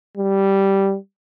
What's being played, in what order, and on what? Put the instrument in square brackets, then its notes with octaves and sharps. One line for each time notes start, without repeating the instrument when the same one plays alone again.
[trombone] G3